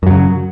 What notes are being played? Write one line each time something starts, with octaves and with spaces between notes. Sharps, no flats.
F#2 C#3 F#3